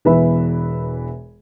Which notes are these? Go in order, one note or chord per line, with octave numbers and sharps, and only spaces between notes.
E1 E3 B3 B4 E5 B5